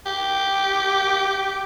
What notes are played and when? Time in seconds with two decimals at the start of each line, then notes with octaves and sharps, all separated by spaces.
0.06 G4